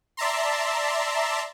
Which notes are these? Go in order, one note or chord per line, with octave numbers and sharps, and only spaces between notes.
D5 E5 A5 A#5 C6